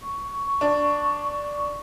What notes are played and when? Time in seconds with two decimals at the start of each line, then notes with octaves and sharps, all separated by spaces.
0.02 C#6
0.61 D4